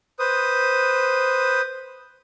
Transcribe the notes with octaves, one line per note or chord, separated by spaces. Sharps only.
B4 C5 D#6